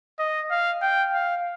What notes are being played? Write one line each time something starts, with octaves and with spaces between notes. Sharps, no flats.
D#5
F5
G5
F5